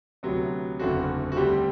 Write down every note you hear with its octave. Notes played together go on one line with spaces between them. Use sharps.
D2 C3 F#3 B3
F#1 E2 D3 A3 C4 F#4
F#4
D2 D3 G3 C4 G4